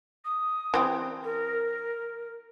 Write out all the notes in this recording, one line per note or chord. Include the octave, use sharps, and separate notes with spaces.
D#6
E3 C4 G4
A#4